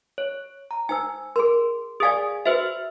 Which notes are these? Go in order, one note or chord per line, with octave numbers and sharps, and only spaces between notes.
C#5
A#5
D#4 C5 G#5 E6
G#4 A#4 C6
G#4 D5 F5 G#5 D#6
F#4 B4 C5 E5